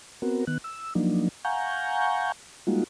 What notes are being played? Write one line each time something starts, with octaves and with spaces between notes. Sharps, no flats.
B3 C4 F#4 A#4
D#3 B3 F#6
E6
F3 F#3 A#3 D4 D#4
F5 F#5 G#5 A#5 C#6 G6
G3 G#3 A#3 D#4 F4 F#4